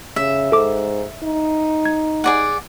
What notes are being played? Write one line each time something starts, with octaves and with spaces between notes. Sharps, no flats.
C#3 E5
G#2 A4 D6
D#4
G#6
G#4 D5 F#5